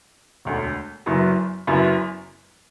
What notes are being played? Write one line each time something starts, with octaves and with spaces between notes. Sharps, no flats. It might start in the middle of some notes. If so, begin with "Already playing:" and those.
E1 D2 D3
F#1 F#2 F#3 B3 E4
F#1 F#2 F#3 B3 E4